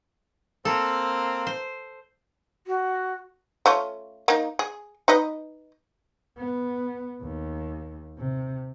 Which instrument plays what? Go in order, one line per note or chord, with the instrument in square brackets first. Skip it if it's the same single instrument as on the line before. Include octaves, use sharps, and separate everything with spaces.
[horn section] A#3 C4 [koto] A4
[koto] C5
[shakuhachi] F#4
[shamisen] A3 C#4 F4
A#3 D#4
G#4
D#4 B4 D#5
[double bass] B3
D#2
C3